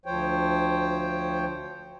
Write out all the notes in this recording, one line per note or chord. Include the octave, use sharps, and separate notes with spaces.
D2 F3 C5 C#5 G5